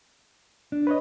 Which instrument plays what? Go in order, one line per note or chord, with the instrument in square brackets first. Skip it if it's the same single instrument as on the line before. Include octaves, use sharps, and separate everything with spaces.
[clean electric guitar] D4
[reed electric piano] B4 C#5 D#5